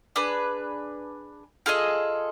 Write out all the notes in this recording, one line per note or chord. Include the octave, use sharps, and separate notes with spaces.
D4 G#4 B4
F4 G#4 A4 D#5